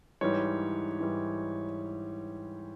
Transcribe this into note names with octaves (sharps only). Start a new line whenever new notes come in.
G#2 E3 G3 C#5
G#2 E3 G3